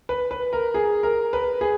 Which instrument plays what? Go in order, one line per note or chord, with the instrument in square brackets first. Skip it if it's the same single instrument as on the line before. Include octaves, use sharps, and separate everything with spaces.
[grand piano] B4
B4
A#4
G#4
A#4
B4
G#4